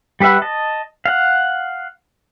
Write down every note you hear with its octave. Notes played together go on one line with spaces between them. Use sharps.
G3 G4 B4 E5 F#5
D#5 A5
F5 F#5